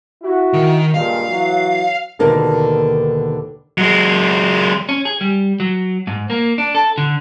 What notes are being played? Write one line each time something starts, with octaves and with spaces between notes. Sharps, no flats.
E4 F#4
D#3
G2 A#2 G#3 F5
E3 F#3
D#2 B2 D3 A#3 D4 D#4
F#3 G#3
C#4
G#4
G3
F#3
G#2
A#3
D4
A4
D3